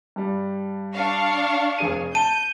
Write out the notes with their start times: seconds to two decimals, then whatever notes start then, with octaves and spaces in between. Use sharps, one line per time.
0.16 G2 G3
0.94 D4 F5 C#6
1.79 F1 G#4 D#7
2.15 A5 G6 D#7